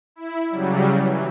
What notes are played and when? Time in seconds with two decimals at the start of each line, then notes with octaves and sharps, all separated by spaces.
0.16 E4
0.50 C#3 F#3 G3
0.98 E3